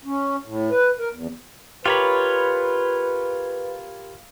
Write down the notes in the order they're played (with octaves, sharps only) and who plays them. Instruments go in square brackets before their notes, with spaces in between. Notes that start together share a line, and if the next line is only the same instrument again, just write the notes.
[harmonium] C#4
A2
B4
A#4
E2
[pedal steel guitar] F4 C#5 [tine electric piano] G4 A#4 B5 [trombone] B4